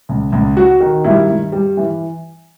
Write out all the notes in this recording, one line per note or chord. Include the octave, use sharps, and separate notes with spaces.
C#2
C#2
F#3 F#4
D#3
G2 E4
G2
G3
E3